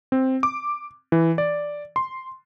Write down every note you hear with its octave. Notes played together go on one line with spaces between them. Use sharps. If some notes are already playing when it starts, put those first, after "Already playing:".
C4
D6
E3
D5
C6